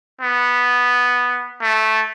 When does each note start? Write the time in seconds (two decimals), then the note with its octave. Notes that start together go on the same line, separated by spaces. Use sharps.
0.21 B3
1.62 A3